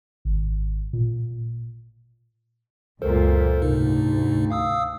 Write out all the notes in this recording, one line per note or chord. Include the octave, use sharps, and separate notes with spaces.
G#1
A#2
C#2 F#2 A#2 A4 A#4 C5
D2 G#2 C3 D#4
F5 D#6 E6